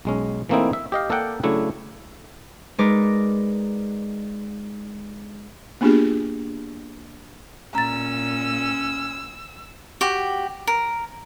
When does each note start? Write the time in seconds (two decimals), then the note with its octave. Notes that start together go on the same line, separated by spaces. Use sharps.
0.05 B1 G#3 C#4
0.49 E3 A3 A#3 C4 D#4 E4
0.73 E5
0.92 G4 D#5 F5
1.10 A#3 A4 A#4 D5 F#5 G5
1.43 C#3 F#3 A3 D4 E4
2.78 G#3 D#4 A#4 B4 D5
5.81 A#3 B3 D4 F4 G4 G#4
7.75 A#2 C#4 A#5 E6 A6
10.01 F#4 G4
10.67 A#4